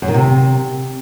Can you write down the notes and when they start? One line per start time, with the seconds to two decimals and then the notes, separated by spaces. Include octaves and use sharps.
0.02 F#2
0.08 D#3
0.14 C3